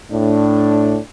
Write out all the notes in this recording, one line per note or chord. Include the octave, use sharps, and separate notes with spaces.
A2 D4